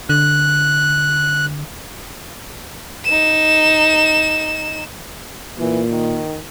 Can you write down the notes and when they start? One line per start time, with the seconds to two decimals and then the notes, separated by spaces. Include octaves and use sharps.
0.09 D3 F#6
3.05 D#4 E7
5.59 A#2 E3
5.91 D#3